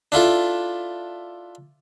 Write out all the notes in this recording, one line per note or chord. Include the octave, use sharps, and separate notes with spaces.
D4 E4 F4 A4